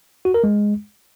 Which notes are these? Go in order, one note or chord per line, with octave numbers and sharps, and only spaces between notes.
F#4
A#4
G#3